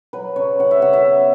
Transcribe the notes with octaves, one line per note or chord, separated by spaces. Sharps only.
F#3 B4
C#3 C#5
C#3 F#5
E5
C#3 F#5
E5
B3